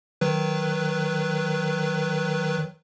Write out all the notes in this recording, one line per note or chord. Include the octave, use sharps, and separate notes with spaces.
D#3 F#3 B4